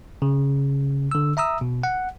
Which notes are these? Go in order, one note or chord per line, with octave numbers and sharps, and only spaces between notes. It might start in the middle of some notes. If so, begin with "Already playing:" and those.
C#3
D3 E6
E5 A#5 D#6 E6
B2
F#5